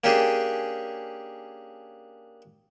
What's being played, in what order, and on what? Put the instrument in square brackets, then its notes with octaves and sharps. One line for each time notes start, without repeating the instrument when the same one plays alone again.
[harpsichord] A#3 C#4 D4 G4 G#4